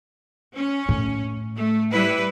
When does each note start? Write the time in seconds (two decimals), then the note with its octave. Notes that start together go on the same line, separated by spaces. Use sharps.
0.55 C#4
0.89 A2
1.56 A3
1.91 G3 E4 B4